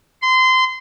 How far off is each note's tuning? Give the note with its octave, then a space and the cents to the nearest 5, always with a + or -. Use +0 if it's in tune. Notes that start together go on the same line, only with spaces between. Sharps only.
C6 -25